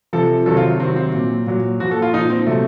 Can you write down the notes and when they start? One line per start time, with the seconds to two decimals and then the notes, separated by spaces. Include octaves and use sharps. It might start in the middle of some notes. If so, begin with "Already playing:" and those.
0.13 C3 F3 A4
0.46 C3 D#3 F#3 A4
0.57 F4
0.79 C3 D#3 F#3 C4
0.96 C4
1.13 A#2 F#3
1.47 A#2 F#3
1.80 A#2 F3 F#4
1.91 A4
2.02 F4
2.14 A#2 F3 D#4
2.30 C4
2.46 C3 F#3 A3